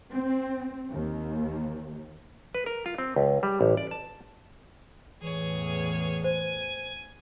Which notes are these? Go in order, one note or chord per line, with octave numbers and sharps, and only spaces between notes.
C4
D#2
B4
A#4
F4
C4
C#2
G3
A1
D5
A5
E2 A2 E3 G#4 C#5
C5 G#5